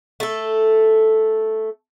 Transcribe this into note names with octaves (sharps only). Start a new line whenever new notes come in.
A3 A4